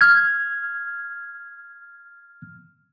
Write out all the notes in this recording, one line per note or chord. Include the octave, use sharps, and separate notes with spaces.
F6 G#6